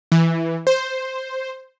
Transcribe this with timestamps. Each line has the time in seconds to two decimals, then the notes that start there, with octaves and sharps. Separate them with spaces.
0.12 E3
0.67 C5